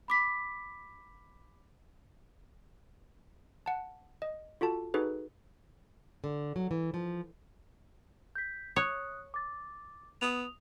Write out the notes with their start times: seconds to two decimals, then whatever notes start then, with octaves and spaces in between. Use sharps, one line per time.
0.08 B5 D6 B6
3.66 F#5 A5
4.22 D#5
4.61 F4 F#4 A4 A5
4.94 D#4 F#4 G#4 A4 B4
6.24 D3
6.56 F#3
6.71 E3
6.94 F3
8.35 G6 B6
8.76 C#5 D#6 F#6
9.34 D6 A6
10.21 B3 D#6 F7